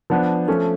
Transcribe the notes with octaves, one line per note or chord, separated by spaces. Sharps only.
F3 B3 D4
F3 A3 C#4